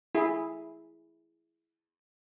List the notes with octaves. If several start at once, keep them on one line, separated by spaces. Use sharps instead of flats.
E4 G#4